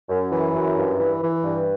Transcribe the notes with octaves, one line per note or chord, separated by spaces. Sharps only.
F#2
E3
F#2
G2
E3
E3
G2